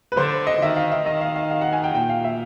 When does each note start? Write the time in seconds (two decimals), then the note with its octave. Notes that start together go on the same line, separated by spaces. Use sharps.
0.12 B4
0.17 D3 C5
0.47 D#5
0.61 D#3 E5
0.76 F5
0.91 E5
1.06 D#3 D#5
1.21 F5
1.36 F5
1.51 F5
1.61 F#5
1.73 G#5
1.84 G5
1.95 A#2 G5
2.09 F5
2.24 E5